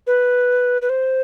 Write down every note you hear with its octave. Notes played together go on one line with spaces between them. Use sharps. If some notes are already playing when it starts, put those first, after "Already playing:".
B4
B4
C5